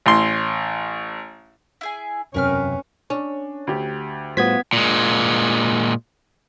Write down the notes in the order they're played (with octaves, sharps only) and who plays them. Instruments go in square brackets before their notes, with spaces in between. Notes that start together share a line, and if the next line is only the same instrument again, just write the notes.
[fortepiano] A1 C6
[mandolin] E4 G#4 G#5
[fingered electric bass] E1 F#2 C3 [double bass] C#4 [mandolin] A#4 B4 F6
[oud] C#4 [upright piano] D4
[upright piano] D2 G4
[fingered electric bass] A2 G3 [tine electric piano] B3 G#6 B6 [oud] F4 F#4 C5
[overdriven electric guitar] A#2 G#3